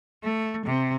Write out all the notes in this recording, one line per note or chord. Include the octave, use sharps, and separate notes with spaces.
A3
C3